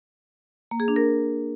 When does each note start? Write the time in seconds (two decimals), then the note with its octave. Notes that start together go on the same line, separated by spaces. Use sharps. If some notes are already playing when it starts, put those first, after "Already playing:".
0.71 A#3
0.80 G#4
0.88 D4
0.96 A#4